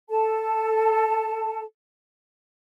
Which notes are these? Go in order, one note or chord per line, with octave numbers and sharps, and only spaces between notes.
A4 A5